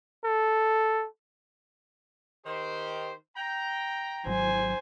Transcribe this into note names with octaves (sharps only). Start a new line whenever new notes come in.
A4
D#3 G4 C5
G5 A#5
G#1 F#3 C5 G#5